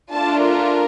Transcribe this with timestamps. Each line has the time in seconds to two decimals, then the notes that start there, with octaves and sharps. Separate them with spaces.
0.13 A3 D4 F4 A5
0.42 A#4